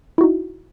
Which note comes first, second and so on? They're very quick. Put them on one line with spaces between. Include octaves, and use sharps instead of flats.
E4 F#4 D#4